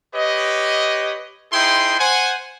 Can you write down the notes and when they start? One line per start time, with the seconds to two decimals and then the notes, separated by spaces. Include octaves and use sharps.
0.14 G4 B4 C#5 D#5
1.53 D#4 E4 G#4 C5 G5 C6
1.99 C5 F#5 G#5